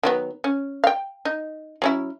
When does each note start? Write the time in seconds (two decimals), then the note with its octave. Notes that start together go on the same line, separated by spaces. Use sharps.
0.03 D#3 F#3 B3
0.44 C#4
0.84 F5 G5
1.25 D#4
1.82 F#3 C#4 E4